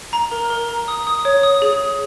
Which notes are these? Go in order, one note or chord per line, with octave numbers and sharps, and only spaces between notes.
A#5
A#4
A#4
A#5
D#6
D#6
C#5
D#6
G#4
G#4